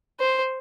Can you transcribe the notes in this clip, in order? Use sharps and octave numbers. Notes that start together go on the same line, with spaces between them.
C5